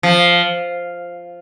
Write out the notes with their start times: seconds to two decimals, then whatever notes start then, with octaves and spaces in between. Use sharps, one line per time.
0.03 F3